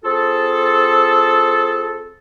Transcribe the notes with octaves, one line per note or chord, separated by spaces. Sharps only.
C4 F4 G#4 A4